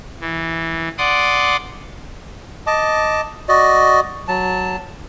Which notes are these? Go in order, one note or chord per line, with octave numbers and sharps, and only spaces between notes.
E3
D5 F#5 C6 D6 D#6
D#5 A5 D6
F#4 D5 D#5
F#3 A5